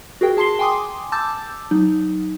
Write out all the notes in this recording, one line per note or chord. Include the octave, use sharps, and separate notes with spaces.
F#4 G#4 A#4 G5
G#4 A5 C6 C7 G7
G5 G#5 C6 D6 D#6
A5 D6 E6 G6 A6
F#3 D#4